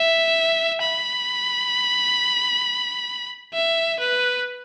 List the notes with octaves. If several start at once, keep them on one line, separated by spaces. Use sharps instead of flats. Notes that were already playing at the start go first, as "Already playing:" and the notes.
Already playing: E5
B5
E5
B4